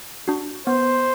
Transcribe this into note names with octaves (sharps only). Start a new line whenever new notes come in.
D4 F#4
B3 C5